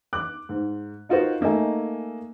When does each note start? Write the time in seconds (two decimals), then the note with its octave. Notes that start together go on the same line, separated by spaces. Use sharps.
0.13 D6 F#6
0.49 G#2
1.09 D#4 F4 F#4 A#4 C5
1.41 A3 A#3 D#4 D#5 G#5